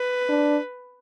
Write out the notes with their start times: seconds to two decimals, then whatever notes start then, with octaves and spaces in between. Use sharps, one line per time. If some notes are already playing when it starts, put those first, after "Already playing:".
Already playing: B4
0.29 D4